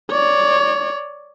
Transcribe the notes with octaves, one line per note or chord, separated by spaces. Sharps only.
C#5 D5